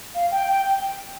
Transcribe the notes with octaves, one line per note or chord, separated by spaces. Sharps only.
F5
G5
G5